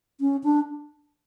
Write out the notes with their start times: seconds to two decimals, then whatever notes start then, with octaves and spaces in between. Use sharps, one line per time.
0.21 C#4
0.44 D4